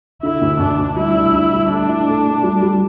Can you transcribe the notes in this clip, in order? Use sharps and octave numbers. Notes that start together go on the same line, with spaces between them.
D3 E4
D2
D2 D4
D2
G3 E4
D4
D4
G3
A3 D4
E4
A3
A3
G3
G3